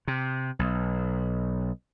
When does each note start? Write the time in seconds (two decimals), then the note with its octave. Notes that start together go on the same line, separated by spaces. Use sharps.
0.08 C3
0.59 B1